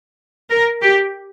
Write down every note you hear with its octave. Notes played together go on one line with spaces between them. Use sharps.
A#4
G4